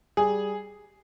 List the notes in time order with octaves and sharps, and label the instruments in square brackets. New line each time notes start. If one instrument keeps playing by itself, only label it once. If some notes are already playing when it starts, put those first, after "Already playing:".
[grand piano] G3 G#4